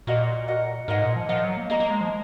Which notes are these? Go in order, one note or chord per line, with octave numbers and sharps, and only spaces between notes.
A#2 F#4 A#4 D#5 F#5
F#4 A#4 D#5 F#5
G#2 A#4 D#5 F#5
A#2
F3
F3 A#4 D#5 F#5
F#3
A#3
A#3 G#4 D#5 A#5
A#3
G#3
F3